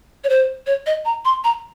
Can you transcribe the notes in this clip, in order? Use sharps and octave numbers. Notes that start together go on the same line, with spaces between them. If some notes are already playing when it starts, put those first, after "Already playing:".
C#5
C5
C#5
D#5
A#5
C6
A#5